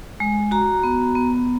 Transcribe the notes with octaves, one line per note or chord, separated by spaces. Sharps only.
G#3
F#4 A#5
B3
B3